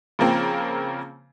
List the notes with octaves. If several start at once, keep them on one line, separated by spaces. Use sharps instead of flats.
C#3 F3 A#3 C4